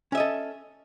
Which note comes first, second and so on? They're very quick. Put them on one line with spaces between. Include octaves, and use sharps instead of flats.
C#4 E5 D#5 A4